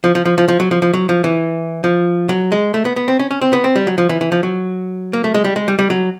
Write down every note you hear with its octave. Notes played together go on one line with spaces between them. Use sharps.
F3
F3
F3
F3
F3
F#3
F3
F3
F#3
F3
E3
F3
F#3
G#3
A3
B3
B3
C4
C#4
C#4
C4
B3
C4
G3
F#3
F3
E3
E3
F3
F#3
A#3
A3
G#3
G3
G#3
G3
G3
F#3